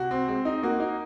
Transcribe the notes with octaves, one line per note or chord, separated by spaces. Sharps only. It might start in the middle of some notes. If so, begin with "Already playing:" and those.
Already playing: C3 F#4
C4
G#3 C4
D#4
A#3 F#4
D#4